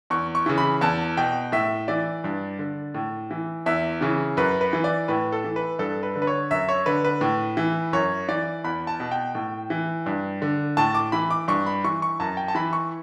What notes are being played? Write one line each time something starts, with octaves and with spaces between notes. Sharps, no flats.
E2 C#6
C#6
C#3 E3
B5
E2 A5
B2 G5
A2 E5
E3 D5
G2
D3
A2
E3
E2 E5
C#3 E3
F#2 B4
B4
E3
D5
A2 B4
A4
E3
B4
G2 A4
B4
D3
B4
C#5
F#2 E5
C#5
D3 B4
B4
A2
E3
F#2 C#5
E3 D5
E2 B5
A5
B2
G5
A2
E3
G2
D3
A2 A5
D6
E3 B5
D6
G2 C#6
B5
E3 C#6
C#6
F#2 A5
G5
A5
E3 B5
C#6